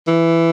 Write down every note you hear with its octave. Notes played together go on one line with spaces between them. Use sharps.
E3